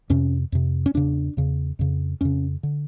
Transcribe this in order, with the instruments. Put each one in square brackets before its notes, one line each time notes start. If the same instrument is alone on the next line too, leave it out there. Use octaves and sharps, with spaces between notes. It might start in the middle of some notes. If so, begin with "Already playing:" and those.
[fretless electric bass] F2 C3 C#4
F2 C3
C#4
E2 C#3 D4
E2 C#3
F2 C#3
F2 C#3 C#4
D3